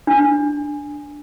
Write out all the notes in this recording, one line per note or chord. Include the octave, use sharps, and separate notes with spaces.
D4